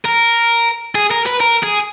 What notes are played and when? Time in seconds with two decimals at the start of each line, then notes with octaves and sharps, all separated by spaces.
0.05 A#4
0.95 G#4
1.11 A#4
1.26 B4
1.40 A#4
1.63 G#4